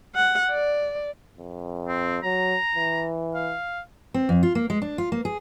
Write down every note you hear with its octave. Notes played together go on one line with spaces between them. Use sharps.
F#5
D5
F2
C4
F#3 A#5
E3
F5
C4
F2
F4
A#3
G#3
D4
F4
A#3
G#4